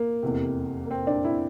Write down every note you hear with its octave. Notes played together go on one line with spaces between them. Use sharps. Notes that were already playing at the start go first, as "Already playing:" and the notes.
Already playing: A#3
F1 E2 C3
A#3
C4
D4
E4